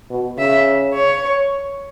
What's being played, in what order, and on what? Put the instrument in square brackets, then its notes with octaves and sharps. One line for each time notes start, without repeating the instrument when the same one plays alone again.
[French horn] B2
[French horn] C#3 [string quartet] E5
[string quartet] C#5